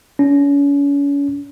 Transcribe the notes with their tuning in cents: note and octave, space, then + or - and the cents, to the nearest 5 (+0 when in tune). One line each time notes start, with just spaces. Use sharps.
C#4 +35